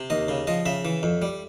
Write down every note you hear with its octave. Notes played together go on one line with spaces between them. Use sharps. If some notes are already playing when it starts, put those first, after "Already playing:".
Already playing: C3
D#2 D#5
C#3
F3 D#5
C#3 E5
E3
F2
G3